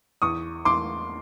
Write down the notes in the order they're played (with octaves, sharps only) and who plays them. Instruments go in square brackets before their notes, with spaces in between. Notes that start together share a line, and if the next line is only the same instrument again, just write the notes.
[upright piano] E2 C#6 D#6
E2 C6 D6